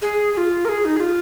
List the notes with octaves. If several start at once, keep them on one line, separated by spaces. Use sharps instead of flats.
G#4
G#4
F4
A#4
G#4
D#4
G#4
F4